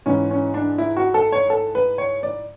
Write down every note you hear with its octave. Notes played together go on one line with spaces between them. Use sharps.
G#2 E3 C#4
C#4
D4
E4
F#4
A4
C#5
A4
B4
C#5
D5